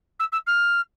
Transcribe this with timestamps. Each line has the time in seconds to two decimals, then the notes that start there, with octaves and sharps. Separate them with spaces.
0.20 E6
0.32 E6
0.47 F6